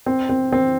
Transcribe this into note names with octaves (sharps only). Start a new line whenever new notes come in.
C4
C4
C4